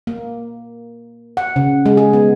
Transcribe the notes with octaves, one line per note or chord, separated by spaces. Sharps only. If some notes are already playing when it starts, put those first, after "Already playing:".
A#3
F#5
C#3
G#3
G#4
B3